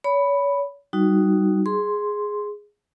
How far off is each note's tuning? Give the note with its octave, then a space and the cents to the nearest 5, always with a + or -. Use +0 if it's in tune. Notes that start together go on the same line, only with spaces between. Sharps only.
C#5 +35 B5 +0
G3 -20 D#4 +0 F#4 +0
G#4 +0 C6 +0